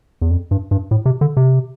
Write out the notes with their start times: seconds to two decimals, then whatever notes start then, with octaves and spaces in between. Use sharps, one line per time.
0.21 E2
0.31 F2
0.51 G2
0.71 G2
0.91 A2
1.06 C3
1.21 D3
1.37 C3